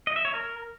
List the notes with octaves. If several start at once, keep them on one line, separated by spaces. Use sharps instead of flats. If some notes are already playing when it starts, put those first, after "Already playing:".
D#5
E5
C#5
A#4